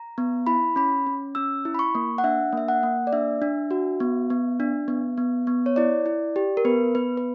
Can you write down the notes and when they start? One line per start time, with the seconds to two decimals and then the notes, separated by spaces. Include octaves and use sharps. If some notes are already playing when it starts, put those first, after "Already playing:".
Already playing: A#5
0.18 B3
0.47 E4 B5
0.76 C#4 B5
1.07 C#4
1.35 C#4 E6
1.65 E4
1.74 B5
1.79 C#6
1.95 A#3
2.18 F#5
2.24 D4 E5
2.53 A#3 E5
2.68 F#5
2.83 A#3
3.07 D5
3.13 D4 E5
3.42 D4
3.71 F#4
4.00 B3
4.30 B3
4.60 D4
4.88 B3
5.18 B3
5.47 B3
5.66 C#5
5.76 E4 D5
6.06 E4
6.36 G4
6.57 A#4
6.65 B3 B4
6.95 B3 B4
7.17 B4